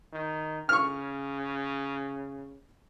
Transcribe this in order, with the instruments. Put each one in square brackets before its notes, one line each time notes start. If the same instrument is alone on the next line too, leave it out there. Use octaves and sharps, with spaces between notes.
[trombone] D#3
[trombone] C#3 [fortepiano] C#6 F6